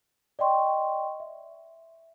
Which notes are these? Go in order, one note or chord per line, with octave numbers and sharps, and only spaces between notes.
D5 D#5 G5 C6 C#6
E5